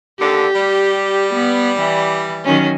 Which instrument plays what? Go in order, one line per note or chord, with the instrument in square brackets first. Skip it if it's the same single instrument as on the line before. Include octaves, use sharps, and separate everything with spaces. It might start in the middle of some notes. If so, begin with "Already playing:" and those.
[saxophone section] D#2 D3 [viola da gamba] G4
[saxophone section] G3
[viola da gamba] B3
E3
D#3 F#3 C#4